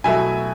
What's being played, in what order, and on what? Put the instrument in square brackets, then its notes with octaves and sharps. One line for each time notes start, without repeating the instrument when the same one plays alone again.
[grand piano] B2 F#3 A3 E4 E5 G#5